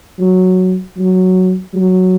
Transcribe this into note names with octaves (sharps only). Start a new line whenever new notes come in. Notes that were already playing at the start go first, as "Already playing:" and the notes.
F#3
F#3
F#3